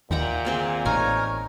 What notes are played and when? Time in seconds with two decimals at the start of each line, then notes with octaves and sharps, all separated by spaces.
0.11 D#2 A#2 E5 F#5 G5 A#5
0.45 A#3 C4 G#4
0.85 A1 D#4 A#4 C#5 G#5 A#5